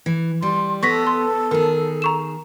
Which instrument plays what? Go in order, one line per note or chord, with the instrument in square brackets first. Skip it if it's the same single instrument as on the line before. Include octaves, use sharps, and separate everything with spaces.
[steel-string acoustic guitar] E3
[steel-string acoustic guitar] G3 [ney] C6
[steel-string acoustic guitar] B3 [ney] A4 [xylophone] C#6 A#6 B6
[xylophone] C6
[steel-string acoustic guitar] D#3 G#4 [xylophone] A#4
[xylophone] A#5 C#6 E7